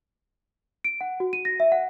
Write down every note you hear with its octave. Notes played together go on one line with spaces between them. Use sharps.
D7
F#5
F#4
D#7
A#6
E5
F#5